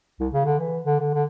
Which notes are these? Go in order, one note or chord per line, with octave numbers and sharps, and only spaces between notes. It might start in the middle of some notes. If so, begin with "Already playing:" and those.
C2
C#3
D3
E3
D3
D3
D3